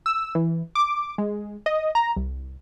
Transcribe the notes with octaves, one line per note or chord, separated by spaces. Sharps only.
E6
E3
D6
G#3
D#5
A#5
C2